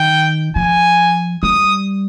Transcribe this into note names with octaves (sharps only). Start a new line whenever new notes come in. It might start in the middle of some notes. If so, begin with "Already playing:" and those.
Already playing: D#3 G5
F3 G#5
G3 D#6